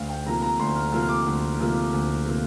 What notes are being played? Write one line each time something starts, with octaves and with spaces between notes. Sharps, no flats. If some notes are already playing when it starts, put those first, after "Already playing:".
Already playing: D2 F5
G5
C3 F3 A#3 A#5
A#5
D2 C6
F6
C3 F3 A#3 F6
F6
D6
D2
C3 F3 A#3
D2
C3 F3 A#3